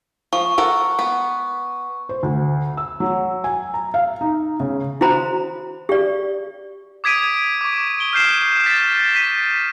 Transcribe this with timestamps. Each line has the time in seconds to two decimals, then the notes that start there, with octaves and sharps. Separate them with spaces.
0.33 F3 C#6
0.58 A4 A#4 F#5
0.99 B3
2.09 C5
2.23 D2
2.77 E6
3.00 F#3
3.44 G#5
3.74 A#5
3.94 F5
4.21 D#4
4.60 C#3
5.01 E4 F#4 C5 A#5 B5
5.89 G4 D5
7.04 D6 D#6 G#6 B6 D7 D#7
7.61 C#6 D6
7.99 D7 G7
8.13 F6 G6 C7 E7
8.66 A6 B6 E7
9.15 B6 D#7